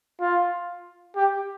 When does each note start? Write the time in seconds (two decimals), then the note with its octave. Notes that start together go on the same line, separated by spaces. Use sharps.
0.21 F4
1.16 G4